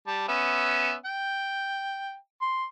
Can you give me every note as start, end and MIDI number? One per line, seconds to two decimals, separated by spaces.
0.07 0.27 55
0.07 0.27 81
0.28 0.94 59
0.28 0.94 61
0.28 0.94 76
1.05 2.15 79
2.42 2.64 84